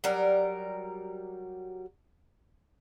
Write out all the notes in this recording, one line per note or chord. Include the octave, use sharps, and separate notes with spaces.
F#3 G3 A#4 A#5